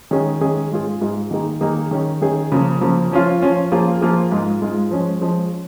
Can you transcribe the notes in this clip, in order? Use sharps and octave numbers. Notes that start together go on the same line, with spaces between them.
D#3 G#3 C#4 G#4
D#3 G#3 C#4 G#4
G#2 G#3 F4 G#4
G#2 G#3 F4 G#4
D#3 A#3 D#4 G#4
D#3 A#3 D#4 G#4
D#3 C#4 G#4
D#3 C#4 G#4
C#3 F3 A#3
C#3 F3 A#3
F3 C#4 F4
F3 C#4 F4
F3 A#3 F4 G#4
F3 A#3 F4 G#4
G#2 G#3 F4
G#2 G#3 F4
F3 G#3 C#4
F3 G#3 C#4